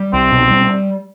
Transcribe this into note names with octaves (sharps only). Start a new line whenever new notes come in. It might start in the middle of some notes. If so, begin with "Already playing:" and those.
Already playing: G3
C2 C4
B2
G3